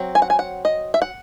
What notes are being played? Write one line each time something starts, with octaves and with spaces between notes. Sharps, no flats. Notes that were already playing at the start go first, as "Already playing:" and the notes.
Already playing: F#3 C4
G#5
F#5
G#5
F#5
D#5
E5
F#5